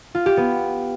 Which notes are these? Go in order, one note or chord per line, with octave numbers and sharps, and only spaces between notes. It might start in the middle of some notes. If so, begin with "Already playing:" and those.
F4
G4
B3